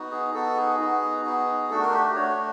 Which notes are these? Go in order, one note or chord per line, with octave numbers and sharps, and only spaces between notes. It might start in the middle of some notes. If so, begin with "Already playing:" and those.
Already playing: B3 D#4 F#4
G#4
B3 D#4 F#4 A4
G#4
B3 D#4 F#4
B3 D#4 F#4
A3 D4 F#4 A4
A#4
G4
G4
A3 D4 F#4 C#5